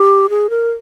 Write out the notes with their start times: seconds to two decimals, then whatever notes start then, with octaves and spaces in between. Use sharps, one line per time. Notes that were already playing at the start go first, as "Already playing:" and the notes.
Already playing: G4
0.30 G#4
0.50 A#4